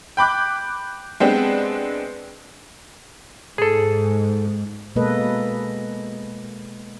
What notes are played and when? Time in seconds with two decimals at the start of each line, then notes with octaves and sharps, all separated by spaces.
0.17 G5 B5 D6 F#6
1.20 G#3 B3 C4 D4 G4
3.58 G#2 G#4 A4
4.96 B2 G#3 A#3 A4 B4 D#5